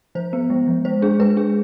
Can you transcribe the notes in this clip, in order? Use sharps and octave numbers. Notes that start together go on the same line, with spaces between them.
F3 C5
B3
G#3
F3
G#3 C5
D4 G#4
G#3 B4
D4 G#4